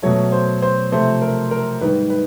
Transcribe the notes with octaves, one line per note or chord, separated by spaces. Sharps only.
B2 F#3 A3 C#5
C5
C5
C3 F3 A3 C5
A#4
A#4
G#2 D#3 G3 B4
B4